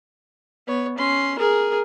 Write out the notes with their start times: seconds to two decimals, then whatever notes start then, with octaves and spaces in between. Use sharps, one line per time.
0.67 B3 C#5
0.97 C#4 C6
1.39 G#4 A#4